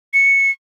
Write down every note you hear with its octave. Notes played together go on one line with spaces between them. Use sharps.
C#7